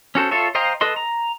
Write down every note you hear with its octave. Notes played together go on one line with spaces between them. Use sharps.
C#4 F#4 A4 C5
F4 A4 C#5 E5
C5 D#5 F5 G5 A#5
A4 B4 D#5 C6
A#5